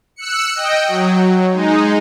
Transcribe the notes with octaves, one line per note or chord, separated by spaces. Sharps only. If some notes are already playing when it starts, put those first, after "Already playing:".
E6 F#6 C#7
D#5 G5
F#3
G#3 D#4